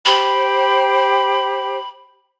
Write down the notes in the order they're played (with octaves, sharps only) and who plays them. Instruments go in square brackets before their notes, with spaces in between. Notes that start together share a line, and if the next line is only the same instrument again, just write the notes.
[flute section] G4 C5 G5 [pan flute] B5